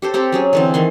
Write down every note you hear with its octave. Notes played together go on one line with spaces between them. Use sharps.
G4 A4 C5
C4 G4 A4 A#5
F#3 C#4 G#4
D3 E3 C4
D#3 E3 C6